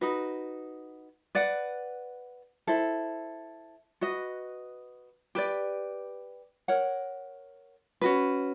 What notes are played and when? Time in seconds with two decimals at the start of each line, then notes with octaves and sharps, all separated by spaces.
0.01 D#4 F#4 B4
1.35 B4 D5 F#5
2.67 E4 A4 C5
4.01 F#4 B4 D#5
5.35 G4 B4 D5
6.68 A#4 C#5 F#5
8.01 C#4 F#4 B4